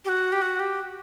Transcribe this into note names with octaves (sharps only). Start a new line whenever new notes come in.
G4
F#4
G4
F#4
G4